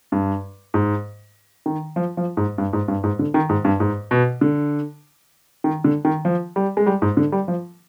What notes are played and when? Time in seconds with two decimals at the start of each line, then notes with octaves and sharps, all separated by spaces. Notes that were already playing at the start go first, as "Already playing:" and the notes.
0.12 G2
0.74 G#2
1.66 D#3
1.96 F3
2.17 F3
2.37 G#2
2.58 G2
2.73 G#2
2.88 G2
3.04 G#2
3.19 D3
3.34 D#3
3.49 G#2
3.65 G2
3.80 G#2
4.11 B2
4.41 D3
5.64 D#3
5.84 D3
6.05 D#3
6.25 F3
6.56 G3
6.77 G#3
6.86 G3
7.02 G#2
7.17 D3
7.32 G3
7.48 F3